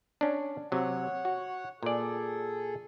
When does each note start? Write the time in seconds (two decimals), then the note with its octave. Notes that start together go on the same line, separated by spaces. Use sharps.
0.21 C#4 D4
0.72 C3 F#3 C#5 F#5
1.25 F#4
1.83 A#2 G#4 A4 D5